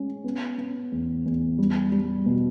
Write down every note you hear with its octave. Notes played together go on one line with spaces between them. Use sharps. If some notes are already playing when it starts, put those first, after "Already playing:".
Already playing: G#3 C#4
B3
B3
E2
E2
G3
G3
B2